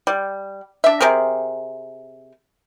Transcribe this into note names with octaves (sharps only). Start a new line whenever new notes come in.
G3
D4 E5
C3 C4 G#4 A#4